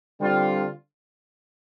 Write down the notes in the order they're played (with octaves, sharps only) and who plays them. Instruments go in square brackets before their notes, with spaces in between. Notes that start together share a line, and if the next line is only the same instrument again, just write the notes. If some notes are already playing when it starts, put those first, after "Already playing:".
[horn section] D3 G3 C4 F4